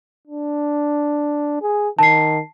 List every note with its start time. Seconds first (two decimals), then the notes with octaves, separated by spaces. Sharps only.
0.27 D4
1.62 G#4
1.99 D#3 A5 C7